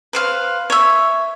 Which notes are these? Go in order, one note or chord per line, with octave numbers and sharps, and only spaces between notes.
B4 C5 F5
C#5 E5